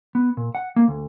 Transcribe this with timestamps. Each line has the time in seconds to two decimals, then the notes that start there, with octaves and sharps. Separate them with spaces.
0.15 B3
0.37 A#2
0.55 F#5
0.76 A#3
0.88 D2